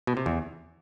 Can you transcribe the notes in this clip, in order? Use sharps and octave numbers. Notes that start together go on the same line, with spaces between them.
B2
C3
E2